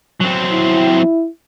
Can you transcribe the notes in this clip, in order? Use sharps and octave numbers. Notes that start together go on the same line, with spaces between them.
F#3 C4
E4